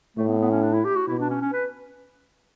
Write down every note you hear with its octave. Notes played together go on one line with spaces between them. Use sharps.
A2 A3
B3
B3
C#4
D4
E4
G4
F#4
B2 E4
D4
C#4
C#4
B4